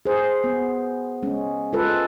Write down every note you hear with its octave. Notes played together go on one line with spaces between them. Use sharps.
G#4 C5
B3
G#3 C#4
G#3 F4 A4 B4